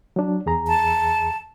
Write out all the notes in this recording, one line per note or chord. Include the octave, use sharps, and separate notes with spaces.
F#3 D4
E2 G#4 A#5
A5